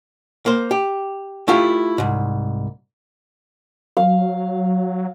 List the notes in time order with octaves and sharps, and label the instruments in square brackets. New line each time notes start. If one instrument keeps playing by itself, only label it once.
[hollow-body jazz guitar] A#3 C5
G4
A3 E4 F4 G4 F5
C2 G#2
[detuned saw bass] F#3 [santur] F5